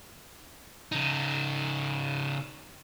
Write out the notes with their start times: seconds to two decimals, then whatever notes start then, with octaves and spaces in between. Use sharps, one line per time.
0.92 C#3 D#4